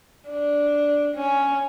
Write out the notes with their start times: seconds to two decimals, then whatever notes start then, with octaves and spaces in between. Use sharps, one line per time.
0.29 D4
1.14 C#4